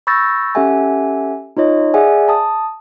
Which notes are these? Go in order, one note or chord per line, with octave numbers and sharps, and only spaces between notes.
B5 C#6 E6 G6 A6 A#6
C#4 G4 A4 E5 F#5 G#5
D#4 F4 C#5 D#5
G#4 D5 E5 F#5 G#5
A5 D#6